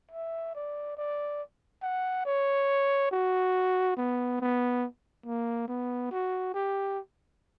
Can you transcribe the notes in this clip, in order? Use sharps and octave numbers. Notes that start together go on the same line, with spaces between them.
E5
D5
D5
F#5
C#5
F#4
B3
B3
A#3
B3
F#4
G4